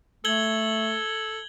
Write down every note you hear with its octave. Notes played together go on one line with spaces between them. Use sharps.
A3 A4 G#6 F#7 G7